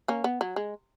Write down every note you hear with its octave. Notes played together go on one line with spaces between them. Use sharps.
A#3 C#4
B3
F#3
G#3